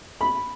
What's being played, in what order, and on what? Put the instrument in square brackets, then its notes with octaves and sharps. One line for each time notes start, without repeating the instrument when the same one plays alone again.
[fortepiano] B5